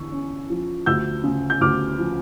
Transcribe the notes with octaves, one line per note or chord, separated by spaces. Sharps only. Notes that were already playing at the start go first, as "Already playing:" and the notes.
Already playing: E2 D3 C#6 E6
C#4
F3
D2 E6 G6
C#3
G6
D2 D6 F6
F3